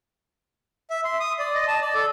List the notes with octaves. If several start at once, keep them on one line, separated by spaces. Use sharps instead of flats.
E5
C6
D#6
D5
D#5
A5
D5
A4